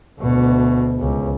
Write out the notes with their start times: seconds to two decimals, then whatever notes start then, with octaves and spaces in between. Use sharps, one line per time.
0.20 D2 B2
1.00 C#2